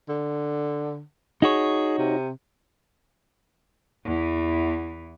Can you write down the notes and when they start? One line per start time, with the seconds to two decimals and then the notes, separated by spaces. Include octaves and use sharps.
0.09 D3
1.42 D#4 F#4 G#4 C#5
1.98 C3
4.04 E2 E3